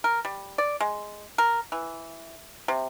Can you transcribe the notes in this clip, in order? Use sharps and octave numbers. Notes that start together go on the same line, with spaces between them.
A#4
G3
D5
G#3
A#4
E3
C3